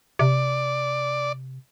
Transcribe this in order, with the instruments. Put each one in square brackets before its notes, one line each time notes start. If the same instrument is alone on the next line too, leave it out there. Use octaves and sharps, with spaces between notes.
[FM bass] C3 [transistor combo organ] D5